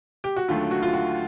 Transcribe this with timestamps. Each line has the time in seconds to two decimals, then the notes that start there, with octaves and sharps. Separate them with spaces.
0.24 G4
0.36 F#4
0.48 D#2 D3 F#3 A3 F4
0.71 F#4
0.82 F4
0.93 F#4